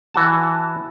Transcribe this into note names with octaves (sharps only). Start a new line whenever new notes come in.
E3 F#4 A5